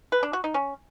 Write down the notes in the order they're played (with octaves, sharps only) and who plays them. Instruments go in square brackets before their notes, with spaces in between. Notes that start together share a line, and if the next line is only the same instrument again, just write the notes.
[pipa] B4
D4
F#4
D#4
C#4